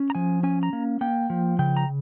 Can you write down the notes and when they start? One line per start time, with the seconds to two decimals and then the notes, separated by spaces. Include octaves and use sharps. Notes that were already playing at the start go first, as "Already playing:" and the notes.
Already playing: C#4
0.10 A#5
0.15 F3 G#5
0.43 C#4 G#5
0.63 A#5
0.73 A#3
1.01 A#3 G5
1.30 F3
1.59 C#3 G5
1.77 A#5